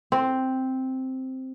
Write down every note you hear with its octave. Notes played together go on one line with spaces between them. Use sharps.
C4